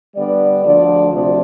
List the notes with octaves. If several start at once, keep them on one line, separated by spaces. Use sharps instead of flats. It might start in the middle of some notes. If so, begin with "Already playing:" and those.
D3 G3 B3 D5
D2 D3 F3 D5
D2 C3 F3 D5